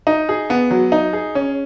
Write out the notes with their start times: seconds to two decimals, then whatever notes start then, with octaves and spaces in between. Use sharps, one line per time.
0.07 D#4
0.29 G#4
0.50 B3
0.71 F#3
0.92 D#4
1.13 G#4
1.35 C#4